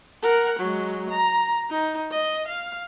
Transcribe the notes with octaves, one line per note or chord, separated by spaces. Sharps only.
A#4 F#5
F#3 G#3
A#5
D#4
D#5
F5